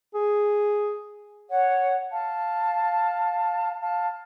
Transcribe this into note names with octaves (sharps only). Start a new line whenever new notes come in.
G#4
C#5 F#5
F5 A5
F5 A5